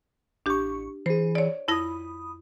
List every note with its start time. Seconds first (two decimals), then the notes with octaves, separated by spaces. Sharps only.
0.46 A1 D4 G4 C#6
1.06 E3 G#4 C5
1.35 C#5 D5
1.68 F2 E4 B5 D#6 A#6